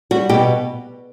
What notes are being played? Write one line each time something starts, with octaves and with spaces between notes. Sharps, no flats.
G3 F#4
B2 G4